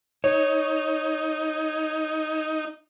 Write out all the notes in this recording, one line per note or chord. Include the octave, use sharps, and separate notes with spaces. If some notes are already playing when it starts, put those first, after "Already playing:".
D#4 C#5